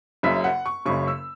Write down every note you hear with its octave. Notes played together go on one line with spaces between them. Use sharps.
F#1 F#2 C#3 E5
F#5
C#6
F#1 F#2 C#3 C#6
E6